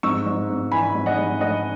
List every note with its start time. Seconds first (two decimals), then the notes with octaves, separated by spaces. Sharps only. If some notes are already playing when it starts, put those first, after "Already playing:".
0.03 G#2 C#6 E6
0.26 G#2
0.50 G#2
0.72 E3 G#5 B5
0.95 G#2
1.06 D#5 F#5
1.18 G#2
1.41 A3 D#5 F#5